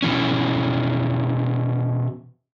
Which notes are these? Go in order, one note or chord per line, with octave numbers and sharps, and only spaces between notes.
B2 E3 C#4